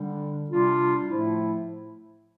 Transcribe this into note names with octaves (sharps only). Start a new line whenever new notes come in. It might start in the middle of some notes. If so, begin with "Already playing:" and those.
Already playing: D3 G3 D4
C3 G3 D4 F4
A2 F3 A3 E4